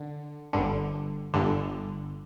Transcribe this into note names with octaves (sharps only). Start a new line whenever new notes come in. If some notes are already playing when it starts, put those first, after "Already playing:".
Already playing: D3
G1 G2 D3
G1 G2 D3